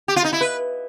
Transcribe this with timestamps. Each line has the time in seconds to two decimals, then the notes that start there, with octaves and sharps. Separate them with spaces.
0.08 G4
0.16 F4
0.24 D#4
0.33 E4
0.41 B4